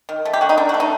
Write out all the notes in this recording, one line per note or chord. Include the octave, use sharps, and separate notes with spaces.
D#3
A3
G4
D3 F#4
D#4
D3 D4
F#4
A3
D#4